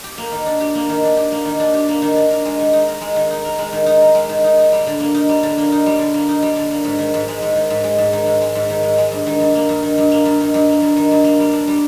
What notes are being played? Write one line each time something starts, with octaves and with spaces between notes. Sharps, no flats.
G4
A#3
D#3
D4
G4
A#3
D#3
D4
G4
A#3
D#3
D4
G4
A#3
D#3
D4
A#4
G#3
D#3
D#4
A#4
G#3
D#3
D#4
A#4
G#3
D#3
D#4
A#4
G#3
D#3
D#4
D#4
G3
D3
A#3
D#4
G3
D3
A#3
D#4
G3
D3
A#3
D#4
G3
D3
A#3
G#2
D#3
G#2
G#3
G#2
D#3
G#2
G#3
G#2
D#3
G#2
G#3
G#2
D#3
G#2
G#3
G2
D#3
G2
A#3
G2
D#3
G2
A#3
G2
D#3
G2
A#3
G2
D#3
G2
A#3
G3
D4
G3